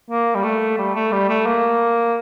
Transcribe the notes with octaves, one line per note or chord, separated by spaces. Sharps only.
A#3
G3
A3
G3
A3
G3
A3
A#3